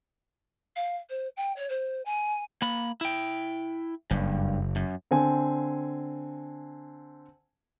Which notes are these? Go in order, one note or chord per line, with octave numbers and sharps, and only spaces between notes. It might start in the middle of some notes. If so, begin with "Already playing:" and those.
F5
C5
G5
C#5
C5
G#5
A#3 B5
E4 G5
F#1 G2
F#2
D3 C4 G#5